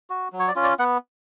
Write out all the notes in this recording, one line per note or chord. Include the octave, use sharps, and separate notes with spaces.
F#4
F#3
C#5
D5
C#4 F4
D5
B3 F#5